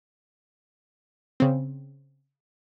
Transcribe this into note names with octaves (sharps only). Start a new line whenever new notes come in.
C#3 C4